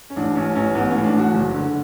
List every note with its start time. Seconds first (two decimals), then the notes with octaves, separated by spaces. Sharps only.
0.10 C#4
0.16 A1 D4
0.36 A1 C#4
0.55 A1 C#4
0.75 A1 B3
0.91 A2 C#4
1.04 D4
1.15 A1 F#4
1.34 F#1
1.54 D3